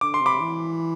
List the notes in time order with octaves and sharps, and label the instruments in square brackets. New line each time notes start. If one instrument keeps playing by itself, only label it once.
[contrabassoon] D3 [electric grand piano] D6
[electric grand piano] C6
[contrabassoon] C3
[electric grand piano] B5 D6
[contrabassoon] E3